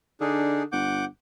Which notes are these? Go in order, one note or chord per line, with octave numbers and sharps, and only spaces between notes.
D3 D4 D#4 G#4
G1 F#5 D6 G6